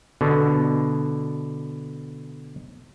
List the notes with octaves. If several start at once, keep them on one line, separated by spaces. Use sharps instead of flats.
B2 D3